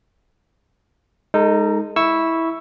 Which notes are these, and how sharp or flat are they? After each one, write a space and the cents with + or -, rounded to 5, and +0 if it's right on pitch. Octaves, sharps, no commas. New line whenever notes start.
G#3 +0 D#4 +0 A4 +45
E4 -10 C#6 +0 E6 +0